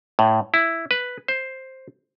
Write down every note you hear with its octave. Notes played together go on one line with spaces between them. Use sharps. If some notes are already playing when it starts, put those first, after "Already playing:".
A2
E4
B4
C5